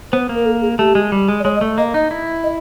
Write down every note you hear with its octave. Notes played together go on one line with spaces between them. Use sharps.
B3 C5
A#3
A#4
A4
G#4
A3 G4
G#3
G3
G#3
D5
G#3 C#5
D#5
A3
A#3 D#5
D#4 D#5
E4
D#5